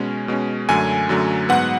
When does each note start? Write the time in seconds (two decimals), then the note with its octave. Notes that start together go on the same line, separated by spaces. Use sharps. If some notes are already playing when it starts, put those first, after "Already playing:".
Already playing: B2 G#3 C#4
0.28 B2 G#3 C#4
0.69 F#2 D3 F#3 A3 G#5
1.09 F#2 D3 F#3 A3
1.49 G#2 F#3 B3 F#5